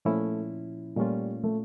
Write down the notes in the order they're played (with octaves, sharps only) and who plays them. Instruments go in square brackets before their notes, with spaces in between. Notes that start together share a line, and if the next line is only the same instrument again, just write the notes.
[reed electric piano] A#2 F3 C#4 E4 [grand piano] A3
[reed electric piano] A#2 A3 C#4 F4 [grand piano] G3
[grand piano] A3